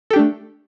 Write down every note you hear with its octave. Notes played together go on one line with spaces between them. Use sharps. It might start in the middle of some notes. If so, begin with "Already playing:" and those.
A3 D4 G4 A4